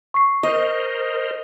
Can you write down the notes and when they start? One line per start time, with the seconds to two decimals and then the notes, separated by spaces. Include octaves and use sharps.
0.14 C#6 C7
0.43 A#4 C5 D#5